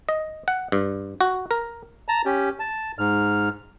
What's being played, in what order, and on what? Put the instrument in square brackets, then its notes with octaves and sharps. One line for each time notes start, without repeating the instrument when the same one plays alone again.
[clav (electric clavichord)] D#5
F#5
G2
F#4
A#4
[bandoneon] A5 A#5
C#4 G4
A5
G#2 F6